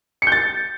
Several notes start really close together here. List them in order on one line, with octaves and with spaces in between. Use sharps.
C#7 G6 A6